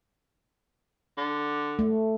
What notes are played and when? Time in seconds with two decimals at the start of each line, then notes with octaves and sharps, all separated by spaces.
1.18 D3
1.79 A3